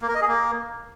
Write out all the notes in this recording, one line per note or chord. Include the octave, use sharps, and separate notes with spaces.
A#3
A#4
D#5
G#4
A#3